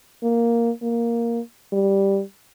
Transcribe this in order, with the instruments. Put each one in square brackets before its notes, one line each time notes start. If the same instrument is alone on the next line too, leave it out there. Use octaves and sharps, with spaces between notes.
[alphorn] A#3
A#3
G3